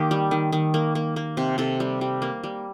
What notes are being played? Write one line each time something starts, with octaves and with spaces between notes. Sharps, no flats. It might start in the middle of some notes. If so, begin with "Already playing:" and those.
Already playing: D#3 A#3 G4
G3
D#3
D#3
A#3
A#3
A#3
C3
C3 A4
G3
G3
A#3
G3